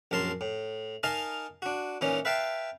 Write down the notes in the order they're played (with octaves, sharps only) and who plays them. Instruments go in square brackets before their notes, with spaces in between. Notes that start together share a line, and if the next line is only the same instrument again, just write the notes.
[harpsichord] A#1 F#2 A#4 A5 C6
A2
D#4 A#4 D#5 F5 G#5 A5
D4 F#4
A#2 E3 C#4 D#4
B4 E5 F5 G5 A5